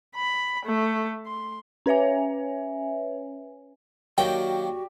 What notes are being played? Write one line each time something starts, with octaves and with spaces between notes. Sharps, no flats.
B5
A3
C6
C#4 B4 C#5 E5 G#5
D#3 F#3 A#3 F#4 G4 D5 G5